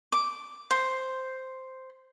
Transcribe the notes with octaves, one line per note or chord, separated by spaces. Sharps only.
D6
C5